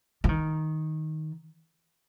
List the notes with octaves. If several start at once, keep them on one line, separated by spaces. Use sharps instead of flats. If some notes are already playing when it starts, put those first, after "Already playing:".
F3
D#3